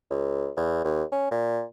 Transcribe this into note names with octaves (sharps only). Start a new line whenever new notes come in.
C#2
E2
D#2
C#4
A#2